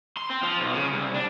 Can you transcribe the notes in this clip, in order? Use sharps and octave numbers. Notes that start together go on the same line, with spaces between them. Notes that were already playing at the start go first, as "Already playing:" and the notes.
C6
C4
F3
B1
C#3
C2
D4